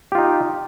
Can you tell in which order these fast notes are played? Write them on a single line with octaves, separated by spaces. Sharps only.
G4 F4 D#4